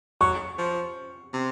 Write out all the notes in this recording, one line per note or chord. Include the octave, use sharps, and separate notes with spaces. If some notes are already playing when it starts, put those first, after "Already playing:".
F#3 C#6
F3
C3